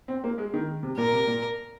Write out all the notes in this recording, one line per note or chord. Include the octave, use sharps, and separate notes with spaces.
C4
A#3
G#3
D#3
C3
A#2 A#4
C3
A#2